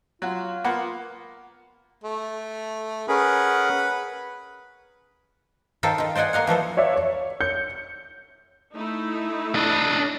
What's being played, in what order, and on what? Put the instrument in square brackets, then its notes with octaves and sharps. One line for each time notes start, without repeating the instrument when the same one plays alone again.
[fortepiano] F#3 F#4 [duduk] F4
[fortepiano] A#3 B3 F#5
[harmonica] A3
[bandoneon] C#4 G#4 A#4 [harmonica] B4 F#5
[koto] D#3 D#4 F4 A4 C5 G5
D#3 F4
C5 D5 D#5 F#5 G#5
A#3 D#5 F5 F#5
E3 F3 A4 C5
[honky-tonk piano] C#5 D5 E5 F5
C#5
G6 C#7
[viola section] A3 D#4 E4
[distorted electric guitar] D4 D#5